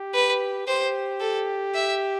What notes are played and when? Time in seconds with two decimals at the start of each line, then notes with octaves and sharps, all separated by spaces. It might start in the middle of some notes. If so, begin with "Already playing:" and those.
Already playing: G4
0.14 B4
0.67 G4 C5
1.20 A4
1.75 E5